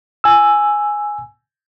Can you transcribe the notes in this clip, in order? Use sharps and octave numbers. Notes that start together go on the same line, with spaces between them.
G#5 E6